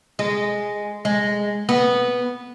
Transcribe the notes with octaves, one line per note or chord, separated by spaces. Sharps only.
G#3
G#3
B3